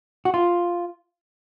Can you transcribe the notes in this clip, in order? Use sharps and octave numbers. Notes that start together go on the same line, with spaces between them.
F#4
F4